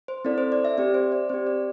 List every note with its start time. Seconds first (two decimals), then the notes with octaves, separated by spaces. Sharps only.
0.08 C5
0.25 C4 E4 A4 D5
0.38 C5
0.52 D5
0.65 E5
0.78 C4 G4 D5
0.94 C5
1.12 D5
1.29 C4 G4 C5
1.47 D5